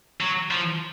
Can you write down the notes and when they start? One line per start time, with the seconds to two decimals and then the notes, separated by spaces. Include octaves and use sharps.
0.21 F#3
0.51 F3